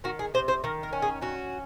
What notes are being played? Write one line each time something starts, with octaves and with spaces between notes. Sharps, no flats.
D#3 F#4
G#4
C3 C5
C5
D#3 A#4
A#4
C#4
G#4
C#4 F#4